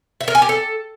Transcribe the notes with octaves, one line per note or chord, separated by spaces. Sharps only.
E5
A#4
G#5
G4
A4